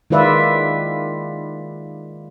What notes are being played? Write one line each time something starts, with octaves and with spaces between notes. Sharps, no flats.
D#3 G#3 F4 B4 D5 E5